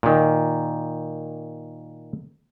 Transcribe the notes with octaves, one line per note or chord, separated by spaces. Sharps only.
A#2 D#3